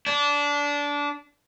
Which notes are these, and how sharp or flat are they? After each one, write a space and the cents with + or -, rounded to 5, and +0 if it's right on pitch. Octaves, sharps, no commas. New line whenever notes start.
D4 -20